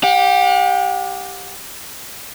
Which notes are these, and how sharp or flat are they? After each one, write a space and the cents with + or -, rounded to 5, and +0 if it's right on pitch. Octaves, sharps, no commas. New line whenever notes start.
G4 +0 F#5 -45